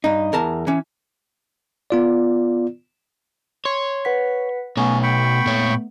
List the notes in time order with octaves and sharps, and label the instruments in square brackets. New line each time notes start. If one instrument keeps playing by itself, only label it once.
[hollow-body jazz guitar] G2 D#4
E2 A#4 A5
E3 C#4
[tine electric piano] B3 F4 D5
[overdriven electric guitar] C#5 [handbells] C6
[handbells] B4 F#5 B6
[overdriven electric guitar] B2 C#5 [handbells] A3 B3 [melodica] C#4
[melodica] G5 B5 C#6
[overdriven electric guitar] A#2 C#5